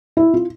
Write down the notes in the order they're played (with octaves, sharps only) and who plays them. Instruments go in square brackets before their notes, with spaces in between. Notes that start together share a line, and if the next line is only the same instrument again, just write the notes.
[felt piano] E4
F4